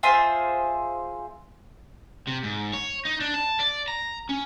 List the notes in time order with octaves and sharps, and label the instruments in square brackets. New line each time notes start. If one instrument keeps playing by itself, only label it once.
[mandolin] F4 G#4 C5 E5
[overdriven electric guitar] C3
G#2
C#5
D#4
D4
A5
D5
A#5
C#4